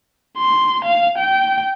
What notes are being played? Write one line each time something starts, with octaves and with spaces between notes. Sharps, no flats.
C6
F5
G5